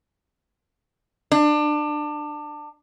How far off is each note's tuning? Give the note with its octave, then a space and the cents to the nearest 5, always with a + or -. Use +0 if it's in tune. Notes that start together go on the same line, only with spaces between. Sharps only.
D4 +25